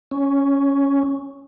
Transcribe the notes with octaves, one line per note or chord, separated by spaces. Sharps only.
C#4